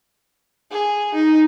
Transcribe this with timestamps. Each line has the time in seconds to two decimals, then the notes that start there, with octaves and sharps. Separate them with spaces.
0.71 G#4
1.15 D#4